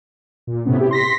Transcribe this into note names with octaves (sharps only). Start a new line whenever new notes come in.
A#2
A2 C3 B3 C#4
E4 G4
C6 A#6 B6